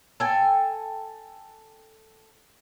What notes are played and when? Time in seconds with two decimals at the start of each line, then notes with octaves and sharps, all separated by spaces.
0.20 A4 G5 G#5